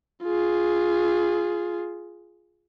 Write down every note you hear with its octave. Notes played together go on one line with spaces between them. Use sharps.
F4 G#4